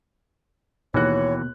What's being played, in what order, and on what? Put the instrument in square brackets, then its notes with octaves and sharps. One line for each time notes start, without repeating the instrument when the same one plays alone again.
[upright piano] D#2 F#6 [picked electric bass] B2 A#3 [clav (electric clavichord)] E3 F#4 [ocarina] C#5